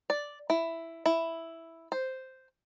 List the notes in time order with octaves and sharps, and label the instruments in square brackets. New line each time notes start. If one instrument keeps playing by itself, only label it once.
[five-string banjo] D5
E4
E4
C5